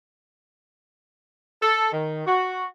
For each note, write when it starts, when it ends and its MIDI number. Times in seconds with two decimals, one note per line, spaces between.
1.62 1.91 69
1.92 2.24 51
2.25 2.64 66